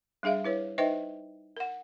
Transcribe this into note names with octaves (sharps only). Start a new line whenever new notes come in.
G3 D4 G#4 E5 F5
E4 B4 C#5
D#4 B4 C5 D#5 E5 G5
A#4 F#5